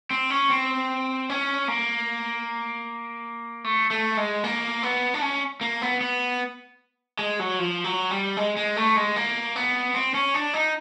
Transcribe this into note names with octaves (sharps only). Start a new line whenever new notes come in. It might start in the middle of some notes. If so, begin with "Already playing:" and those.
C4
C#4
C4
C#4
A#3
A3
A3
G#3
A#3
B3
D4
C#4
A#3
B3
B3
G#3
F#3
F3
F#3
G3
G#3
G#3
A3
G#3
A#3
B3
C4
C#4
D4
D#4